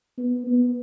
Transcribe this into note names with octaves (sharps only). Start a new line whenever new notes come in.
B3
B3